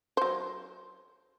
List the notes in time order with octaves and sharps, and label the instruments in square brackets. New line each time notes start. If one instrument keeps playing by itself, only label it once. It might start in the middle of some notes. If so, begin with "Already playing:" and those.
[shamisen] F#3 C5